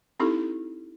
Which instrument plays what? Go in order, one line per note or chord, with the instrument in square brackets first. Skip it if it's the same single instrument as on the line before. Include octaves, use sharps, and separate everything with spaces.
[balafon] C4 D#4 E4 G4 A4